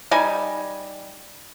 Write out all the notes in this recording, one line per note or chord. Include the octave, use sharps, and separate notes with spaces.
G3 D#4 G#5